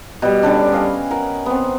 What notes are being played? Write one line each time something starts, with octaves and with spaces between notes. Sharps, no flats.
B2 G3
D3 G3 C#4 D4
D#5 F5 G#5
A#4 F#5
B3 C4